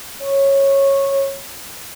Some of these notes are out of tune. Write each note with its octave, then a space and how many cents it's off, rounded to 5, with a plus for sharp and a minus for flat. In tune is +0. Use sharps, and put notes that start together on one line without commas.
C#5 -15